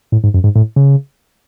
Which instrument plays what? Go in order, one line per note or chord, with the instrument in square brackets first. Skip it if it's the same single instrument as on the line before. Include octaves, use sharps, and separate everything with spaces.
[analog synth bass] A2
G#2
F#2
G#2
A2
C#3